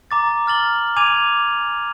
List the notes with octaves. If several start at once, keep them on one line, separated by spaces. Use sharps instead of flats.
A#5 D6 A6
A#5 F6 A6 F#7 G7
G#5 D6 G#6 D#7 F7